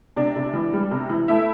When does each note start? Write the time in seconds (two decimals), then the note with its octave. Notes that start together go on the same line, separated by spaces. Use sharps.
0.16 C3 D4 D5
0.36 C3
0.53 E3
0.73 G3
0.91 C3
1.09 E3
1.28 A3 E4 E5